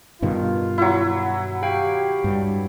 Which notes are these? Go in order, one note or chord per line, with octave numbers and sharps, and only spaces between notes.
G2 B2 D#3 F4
F#3 E4
F#5
F#4 G4 F5 G5
G2 G3